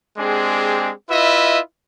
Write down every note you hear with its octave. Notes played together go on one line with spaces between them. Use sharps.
G#3 C4 D4 G4 G#4
E4 F4 B4 D#5 E5